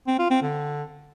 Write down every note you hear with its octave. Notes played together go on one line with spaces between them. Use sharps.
C4
F4
C4
D3